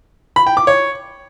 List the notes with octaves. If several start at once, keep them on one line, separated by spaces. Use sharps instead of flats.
B5
G5
D6
C#5